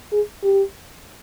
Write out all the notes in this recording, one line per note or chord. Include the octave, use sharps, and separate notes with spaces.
G#4
G4